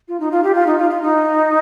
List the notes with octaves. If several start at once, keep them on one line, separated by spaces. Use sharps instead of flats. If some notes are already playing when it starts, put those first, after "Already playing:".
F4
D#4
F4
G4
F4
D#4
F4
F4
D#4